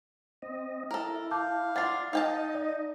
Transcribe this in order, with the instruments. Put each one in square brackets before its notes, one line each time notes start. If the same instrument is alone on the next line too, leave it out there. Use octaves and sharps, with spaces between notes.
[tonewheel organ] C4 D#5
[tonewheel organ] E4 [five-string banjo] A4 A#4
[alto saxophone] F5 [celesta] A5 D6 G6
[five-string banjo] D4 F4 [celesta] F#5 A6 C7
[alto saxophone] D#4 [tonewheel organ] D#5 [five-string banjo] F5 G5 A5
[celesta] D5